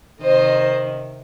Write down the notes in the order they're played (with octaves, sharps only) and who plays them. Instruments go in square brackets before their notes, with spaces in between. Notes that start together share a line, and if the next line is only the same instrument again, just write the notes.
[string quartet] C3 D#3 C5 D#5